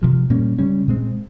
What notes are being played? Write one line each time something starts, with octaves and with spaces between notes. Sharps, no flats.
C3 F3 G#3
A#2 G3 A#3 C#4
C#3 G3 C#4
A#2 G#3 C4